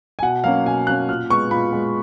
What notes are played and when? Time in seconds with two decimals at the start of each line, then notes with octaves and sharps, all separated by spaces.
0.19 G#5
0.22 B2 F#5
0.44 F#3 A#3 C#4 F5
0.65 B2 G#5
0.87 F#3 A#3 C#4 F#6
1.09 A#2 F6
1.30 G#3 B3 C#6
1.51 A#2 B5
1.73 G#3 B3